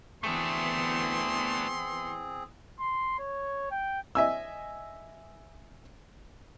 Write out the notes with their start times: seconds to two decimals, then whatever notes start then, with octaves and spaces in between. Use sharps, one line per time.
0.23 E3 A3 B3 C4 D4 G#4 C6
2.80 C6
3.19 C#5
3.71 G5
4.15 D#5 E5 G#5 E6